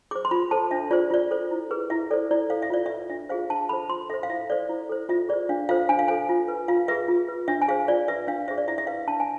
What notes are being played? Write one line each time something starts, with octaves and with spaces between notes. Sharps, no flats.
G#4 C5 D6
C6
F4 B5
A4 C5 A5
D4 E5
F4 G#4 C5 D5
F4 D5
A4 C5
E4
G#4 B4
E4 E5
A4 C5 D5
E4 D5
A4 C5 F5
E5
F4 D5
B4 E5
D4 E5
F4 G#4 C5 F5
D4 A5
A4 C5 B5
F4 C6
A4 C5 E5
F5
E4 E5
A4 C5 D5
E4
A4 C5
F4 E5
G#4 C5 D5
D4 F5
F4 A4 C5 F5
D4 G#5
F5
A4 C5 G#5
F4
B4
F4 F5
G#4 B4 E5
F4
B4
D4 E5
G#5
G#4 C5 F5
F4 D5
B4 E5
D4 F5
G#4 C5 E5
D5
E4 E5
E5
B4 F5
D4 A5
G#5